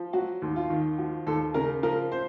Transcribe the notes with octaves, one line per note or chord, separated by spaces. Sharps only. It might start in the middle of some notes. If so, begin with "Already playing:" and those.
Already playing: F3
F#3 F#4
D#2
F4
D#3
F3 F#4
D#2 A4
C#3 A#4
F3 A#4
C5